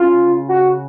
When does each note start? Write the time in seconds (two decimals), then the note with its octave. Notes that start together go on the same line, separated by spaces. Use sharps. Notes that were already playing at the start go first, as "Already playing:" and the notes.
Already playing: C#3 F4
0.49 F#4